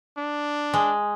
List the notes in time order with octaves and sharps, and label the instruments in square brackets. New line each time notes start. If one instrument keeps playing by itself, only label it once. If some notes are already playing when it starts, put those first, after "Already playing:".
[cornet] D4
[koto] G#3